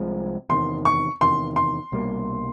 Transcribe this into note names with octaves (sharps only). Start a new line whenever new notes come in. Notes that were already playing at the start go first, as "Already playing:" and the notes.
Already playing: C2 C3 F3 G#3
E2 C3 D#3 C6
C#6
E2 C3 D#3 C6
C6
C2 B2 G3 A#3